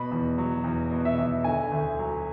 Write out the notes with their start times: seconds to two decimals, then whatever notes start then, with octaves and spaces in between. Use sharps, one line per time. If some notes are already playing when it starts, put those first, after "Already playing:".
Already playing: B2 B5
0.11 E2
0.38 F#3
0.64 E2
0.91 B2
1.05 E5
1.18 E2
1.44 D3 G#5
1.72 D2
1.99 F#3